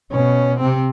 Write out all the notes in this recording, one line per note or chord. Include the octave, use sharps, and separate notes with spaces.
B2 C#4
C3 C4